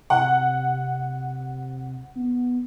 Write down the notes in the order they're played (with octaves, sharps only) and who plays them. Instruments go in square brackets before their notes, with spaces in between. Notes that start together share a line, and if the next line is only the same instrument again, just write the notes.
[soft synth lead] C3 [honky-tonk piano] F#5
[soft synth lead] B3